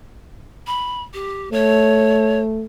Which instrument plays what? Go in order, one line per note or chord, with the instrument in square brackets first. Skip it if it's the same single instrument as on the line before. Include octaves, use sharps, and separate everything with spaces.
[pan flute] B5
G4
[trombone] A3 [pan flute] C#5